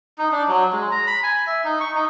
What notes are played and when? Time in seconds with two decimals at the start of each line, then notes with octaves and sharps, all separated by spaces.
0.18 D#4
0.32 D4
0.48 F#3
0.73 G#3
0.91 A#5
1.07 B5
1.23 G#5
1.47 E5
1.64 D#4
1.80 C#6
1.95 D#4